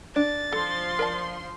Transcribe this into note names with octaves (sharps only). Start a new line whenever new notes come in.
D4 A6
F3 A4 C6
A#4 D5 A5